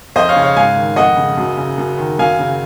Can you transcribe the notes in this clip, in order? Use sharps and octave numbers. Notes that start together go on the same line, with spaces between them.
F2 C5 D#5
C#5 F5
C#3
C#5 F5
G#2 F5 G#5
D#3
F2 D#5 F#5
C#3
F#2
C#3
F#2
D#3
F#2 F5 G#5
C#3